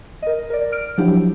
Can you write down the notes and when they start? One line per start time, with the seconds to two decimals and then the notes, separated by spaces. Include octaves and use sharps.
0.22 A#4 D#5
0.50 A#4 D5
0.72 F6 D7
0.98 F3 F#3 D4 E4 G4